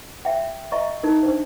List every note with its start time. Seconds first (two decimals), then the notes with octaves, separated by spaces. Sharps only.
0.25 E5 G5
0.72 D#5 E5 A#5 C6 C#6
1.03 D#4 A#4
1.23 D4 C5